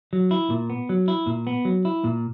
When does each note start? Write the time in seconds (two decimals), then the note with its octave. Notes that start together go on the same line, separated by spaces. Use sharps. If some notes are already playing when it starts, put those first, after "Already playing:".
0.13 F#3
0.31 E4
0.50 A#2
0.70 B3
0.89 F#3
1.08 E4
1.27 A#2
1.47 B3
1.65 F#3
1.85 E4
2.04 A#2